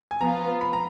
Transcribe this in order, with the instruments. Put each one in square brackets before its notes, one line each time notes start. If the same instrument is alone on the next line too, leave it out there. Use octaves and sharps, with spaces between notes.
[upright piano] G#5
[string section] F3 B3 F4 [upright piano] A#5
[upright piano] B5
A#5